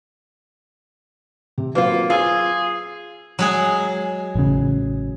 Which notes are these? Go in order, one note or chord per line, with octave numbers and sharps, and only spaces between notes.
C3
F#3 A#3 F4 B4 C5
F4 G#4 E6
F#3 G#3 G#4
A1 C#3